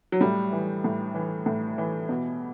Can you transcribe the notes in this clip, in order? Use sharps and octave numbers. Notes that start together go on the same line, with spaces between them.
F#3
A2 G3
E3
A2
E3
A2
E3
B2